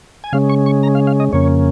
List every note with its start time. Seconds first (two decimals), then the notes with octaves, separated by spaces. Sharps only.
0.24 G#5
0.33 C#3 G#3 C#4 F5
0.49 C#6
0.66 C#6
0.83 A#5
0.95 F5
1.07 F5
1.20 D#5
1.33 F2 C#3 A#3 C#4 C#5